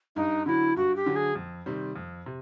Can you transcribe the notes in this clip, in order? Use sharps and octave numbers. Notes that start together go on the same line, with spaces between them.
G2 D#4
D3 F#3 E4
G2 F#4
G4
D3 F#3
G#4
F2
C3 D#3 G3 C4
F2
C3